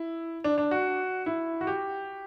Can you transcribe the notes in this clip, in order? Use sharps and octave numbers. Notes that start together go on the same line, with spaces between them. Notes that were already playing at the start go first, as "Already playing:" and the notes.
Already playing: E4
D4
D4
F#4
E4
F#4
G4